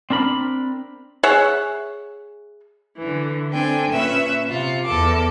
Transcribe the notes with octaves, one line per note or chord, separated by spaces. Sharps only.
C4 D4 A#4 B5
G#4 C#5 E5 F#5
D3 E3
C4 D4 A4 G5 G#5
A#2 C#4 B4 E5 E6
C3 F4
E2 A4 D6